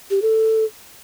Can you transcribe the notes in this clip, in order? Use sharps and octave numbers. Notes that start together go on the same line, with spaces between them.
G4
A4